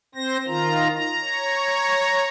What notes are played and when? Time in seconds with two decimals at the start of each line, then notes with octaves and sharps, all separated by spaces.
0.15 C4 C5 A#6
0.47 D#3 F4 A#5
0.91 A#5
1.20 C#5